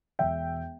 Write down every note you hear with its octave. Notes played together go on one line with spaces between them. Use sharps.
E1 E5 G5